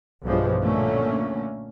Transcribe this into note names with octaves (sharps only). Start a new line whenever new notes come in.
B1 G2 E3 F3 G#3
A#2 D3 A3 A#3 C#4